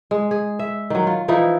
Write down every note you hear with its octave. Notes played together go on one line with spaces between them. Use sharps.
G#3
G#4
E5
D#3 F#3
F4
E3 F3 D#4 E4